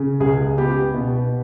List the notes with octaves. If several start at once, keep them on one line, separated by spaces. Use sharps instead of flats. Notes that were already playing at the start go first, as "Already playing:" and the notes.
Already playing: C#3
C#2 G#4
B3 G4
B2